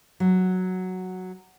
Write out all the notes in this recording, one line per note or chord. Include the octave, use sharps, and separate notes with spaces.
F#3